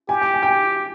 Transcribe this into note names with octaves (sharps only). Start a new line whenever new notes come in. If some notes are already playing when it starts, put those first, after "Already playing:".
G4 G#5
G5
G#5
G5
G#5